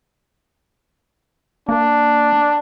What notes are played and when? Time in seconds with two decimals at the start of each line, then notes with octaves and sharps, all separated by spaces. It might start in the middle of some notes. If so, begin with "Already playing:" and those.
1.69 A#3 D4